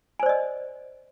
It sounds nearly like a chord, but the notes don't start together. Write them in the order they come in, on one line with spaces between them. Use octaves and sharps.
G#5 C5 D5 D#5